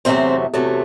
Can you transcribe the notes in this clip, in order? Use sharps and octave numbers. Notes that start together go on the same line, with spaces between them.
E2 C3 F#3 A3 C4 C5
E2 C3 F#3 A3